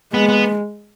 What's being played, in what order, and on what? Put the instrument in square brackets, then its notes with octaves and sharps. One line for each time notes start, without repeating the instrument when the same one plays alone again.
[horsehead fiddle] G#3 [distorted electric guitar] B3
[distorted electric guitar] B3